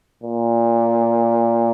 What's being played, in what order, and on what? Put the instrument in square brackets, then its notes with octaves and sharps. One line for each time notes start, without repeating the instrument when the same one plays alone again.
[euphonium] A#2